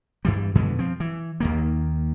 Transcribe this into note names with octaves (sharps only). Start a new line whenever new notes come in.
G2 E3 G3
F2 B2 D3 G#3
F3 C4
E3
D#2 D#3 A#3